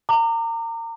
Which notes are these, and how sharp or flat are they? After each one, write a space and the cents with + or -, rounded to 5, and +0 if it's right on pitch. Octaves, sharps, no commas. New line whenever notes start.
A#5 -30 D6 +25